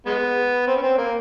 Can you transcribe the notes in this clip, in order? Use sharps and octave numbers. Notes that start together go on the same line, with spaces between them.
G#3 B3
C4
C#4
C4
A#3